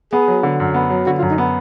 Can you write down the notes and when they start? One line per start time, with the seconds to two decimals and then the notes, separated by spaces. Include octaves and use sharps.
0.12 B3 G#4
0.28 F#3
0.43 D3
0.60 F#2
0.74 B3
0.90 F#3
1.06 D3 F#4
1.18 F4
1.22 F#2
1.30 D#4
1.38 B3